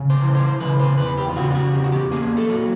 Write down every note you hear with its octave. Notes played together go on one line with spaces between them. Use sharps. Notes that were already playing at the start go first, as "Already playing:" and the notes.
Already playing: C#3
C5
E3
C5
C#3 B4
C5
E2 B4
G4
F4
C#3 F#4
F4
F#4
E2 G4
F#4
G4
A#3 G#4
A4
F#3